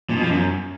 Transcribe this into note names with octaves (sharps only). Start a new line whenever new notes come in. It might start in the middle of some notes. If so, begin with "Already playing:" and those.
A#2
B2
F3
F#2